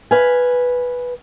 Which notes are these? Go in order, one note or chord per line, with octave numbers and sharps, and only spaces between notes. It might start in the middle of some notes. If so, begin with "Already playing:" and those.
B4 F5 G#5